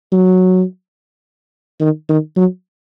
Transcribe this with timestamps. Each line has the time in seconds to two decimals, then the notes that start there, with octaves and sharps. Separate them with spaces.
0.12 F#3
1.81 D#3
2.09 D#3
2.37 F#3